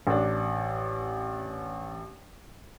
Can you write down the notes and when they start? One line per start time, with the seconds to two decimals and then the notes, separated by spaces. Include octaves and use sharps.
0.07 A1 D4